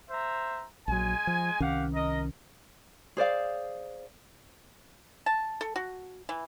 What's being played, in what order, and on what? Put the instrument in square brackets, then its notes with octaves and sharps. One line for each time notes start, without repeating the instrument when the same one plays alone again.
[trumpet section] C5 E5 A#5
[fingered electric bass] A#1 F#3 [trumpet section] G#3 G#5
[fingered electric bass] F3
[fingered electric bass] C2 D#3 C#4 [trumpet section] G4 F5 F#5
[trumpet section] A#4 D#5
[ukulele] G#4 C5 D5 F5
[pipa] A5
A4
F#4
E3